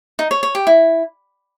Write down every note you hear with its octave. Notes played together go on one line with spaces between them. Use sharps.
D#4
C#5
C#5
G4
E4